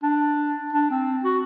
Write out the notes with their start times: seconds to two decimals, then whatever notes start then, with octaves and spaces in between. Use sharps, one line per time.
0.03 D4
0.73 D4
0.91 C4
1.23 F#4